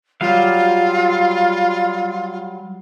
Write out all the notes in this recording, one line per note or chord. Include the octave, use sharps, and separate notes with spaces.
F#3 G3 F4 F5